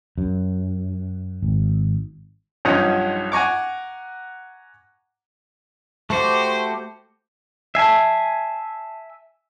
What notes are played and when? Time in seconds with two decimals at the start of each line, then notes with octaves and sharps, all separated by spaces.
0.18 F#2
1.43 G#1
2.65 B1 G2 F3 C#4 D#4 F#5
3.32 F#5 G#5 A#5 C#6 D6
6.10 A3 F#4 G4 C5
7.75 E5 G#5 A5 B6 C7